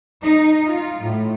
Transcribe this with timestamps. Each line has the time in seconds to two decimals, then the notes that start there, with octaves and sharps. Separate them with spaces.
0.23 D#4
0.67 F4
1.02 A2